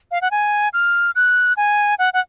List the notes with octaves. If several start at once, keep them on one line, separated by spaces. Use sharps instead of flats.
F5
F#5
G#5
F6
F#6
G#5
F#5
F#5